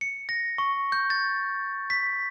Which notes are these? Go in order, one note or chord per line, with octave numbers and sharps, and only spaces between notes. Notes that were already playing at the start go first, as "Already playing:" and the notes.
C#7
A#6
C#6
G6
A6
B6